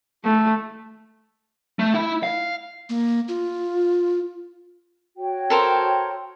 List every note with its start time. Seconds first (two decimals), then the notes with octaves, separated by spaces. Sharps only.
0.24 A3
1.79 A3
1.94 E4
2.23 F5
2.89 A#3
3.28 F4
5.17 F#4 C#5 G5
5.50 A4 A#4 C5